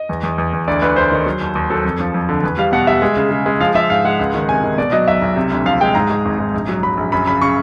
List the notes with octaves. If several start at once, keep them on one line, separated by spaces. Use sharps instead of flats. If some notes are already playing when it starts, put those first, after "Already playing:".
Already playing: D#5
E2
E2
E2
E2
D2 D5
D2 B4
D2 C5
D#3
F#3
D#2
D#2
F#3 A4
F2
F3
F2
D3
E2 B4
G3 F5
B2 F#5
G3 E5
G#3
C#3
C#3
G#3
F3 F5
F3 E5
G#2 F5
G#3 F#5
C#2
D#3
C3 G#5
D#3
B2 D5
F#3 D#5
B1 E5
B1
C3
D2
F3 F5
G#3 G5
G#2 A#5
G#3
G#1
G#2
A#1
F#3
F#3 B5
A#1
F#2 B5
C#3 B5
C#3 C#6